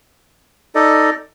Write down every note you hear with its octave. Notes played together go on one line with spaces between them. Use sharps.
D#4 A4 D5 D#5